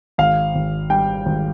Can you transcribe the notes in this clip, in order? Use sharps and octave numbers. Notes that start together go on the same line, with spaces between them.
G#1 F5
G#1
G3 G5
G#1